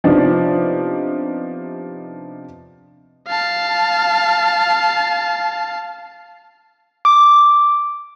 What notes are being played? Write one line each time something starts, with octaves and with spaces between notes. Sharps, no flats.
C3 F3 B3 D4 D#4
F5 A5
D6